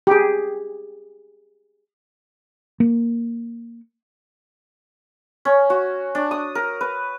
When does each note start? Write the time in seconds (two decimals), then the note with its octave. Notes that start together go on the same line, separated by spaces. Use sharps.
0.07 G4 G#4
2.80 A#3
5.45 C#4
5.70 F#4
6.15 D4
6.31 D#6
6.55 A#4
6.81 B4